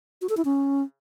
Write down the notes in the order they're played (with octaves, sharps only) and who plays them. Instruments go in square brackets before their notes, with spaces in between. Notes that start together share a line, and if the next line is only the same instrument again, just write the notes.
[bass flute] F#4
A4
E4
C#4